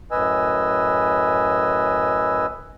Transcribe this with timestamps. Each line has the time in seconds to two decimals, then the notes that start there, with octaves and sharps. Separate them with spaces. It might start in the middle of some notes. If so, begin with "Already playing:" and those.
0.11 F#2 A2 B4 D#5 G#5 E6